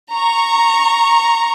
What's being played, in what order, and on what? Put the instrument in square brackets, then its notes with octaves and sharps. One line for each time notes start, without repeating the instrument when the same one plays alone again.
[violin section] A#5 C#6